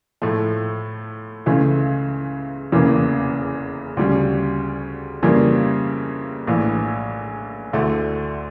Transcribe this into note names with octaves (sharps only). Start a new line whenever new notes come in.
A2 F3 A3
C#2 C#3 E3 A3
F1 E2 C#3 E3 A#3
D2 C#3 G3
F2 C#3 E3 G3 A#3
A#1 A2 E3
D2 D3 A3 E4